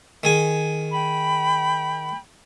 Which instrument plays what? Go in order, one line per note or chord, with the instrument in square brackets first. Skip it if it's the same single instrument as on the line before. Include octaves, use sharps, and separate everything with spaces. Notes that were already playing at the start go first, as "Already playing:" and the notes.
[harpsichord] D#3 G#4 G#5
[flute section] G5 B5